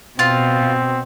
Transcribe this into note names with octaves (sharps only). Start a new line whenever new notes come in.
B2 C4 F4